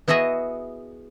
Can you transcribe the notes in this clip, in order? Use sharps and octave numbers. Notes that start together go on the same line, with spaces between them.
B3 E4 F#4 G#4 D#5 E5